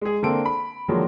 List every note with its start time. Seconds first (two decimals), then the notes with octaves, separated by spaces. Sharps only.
0.01 G#3 G#4
0.23 D3 A#3 C4 A4 D7
0.45 B5
0.88 D3 D#3 F3 F#3 G#3 A#3